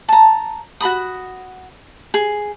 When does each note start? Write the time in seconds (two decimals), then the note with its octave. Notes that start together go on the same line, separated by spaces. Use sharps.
0.09 A5 A#5
0.80 F#4 A4 B5 D#6
2.14 G#4